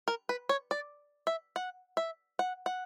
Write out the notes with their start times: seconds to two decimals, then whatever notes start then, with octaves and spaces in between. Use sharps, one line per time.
0.08 A#4
0.29 B4
0.49 C#5
0.71 D5
1.27 E5
1.56 F#5
1.97 E5
2.39 F#5
2.66 F#5